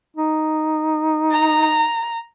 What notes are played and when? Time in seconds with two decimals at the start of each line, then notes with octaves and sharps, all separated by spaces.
0.17 D#4
1.31 A#5